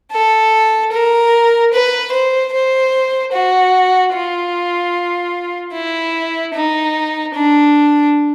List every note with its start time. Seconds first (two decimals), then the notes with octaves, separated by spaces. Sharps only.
0.12 A4
0.92 A#4
1.73 B4
2.12 C5
2.53 C5
3.32 F#4
4.14 F4
5.73 E4
6.54 D#4
7.34 D4